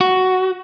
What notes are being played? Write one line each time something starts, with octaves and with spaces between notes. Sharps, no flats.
F#4